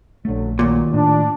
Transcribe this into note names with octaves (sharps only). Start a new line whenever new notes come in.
A#1 D3 F#3 A3
D#2 A#2 F#3
A2 D4